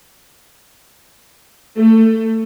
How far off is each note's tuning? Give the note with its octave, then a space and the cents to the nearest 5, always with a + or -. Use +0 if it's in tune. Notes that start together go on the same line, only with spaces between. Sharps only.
A3 +20